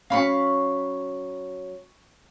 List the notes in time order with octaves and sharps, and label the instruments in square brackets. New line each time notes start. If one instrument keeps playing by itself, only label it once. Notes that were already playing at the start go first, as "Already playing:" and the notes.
[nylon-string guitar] F#3 C#4 [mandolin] F5 B5 C#6